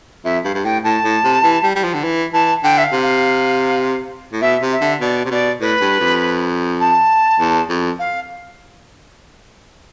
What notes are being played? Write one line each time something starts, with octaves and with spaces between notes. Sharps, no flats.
F2 E5
G2 F5
G2
A2 G5
A2 A5
A2
C3
E3
G3
G3
F3
D3
E3
E3 A5
D3 G5
E5
F5
C3
F5
A2
B2 E5
C3
E5
D3
B2 D5
C3
B2 D5
A2 B4
G2
F2
A5
E2
F2
F5